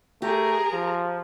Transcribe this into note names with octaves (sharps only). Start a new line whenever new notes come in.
A3 G4 G#4 A#4 A#5
F3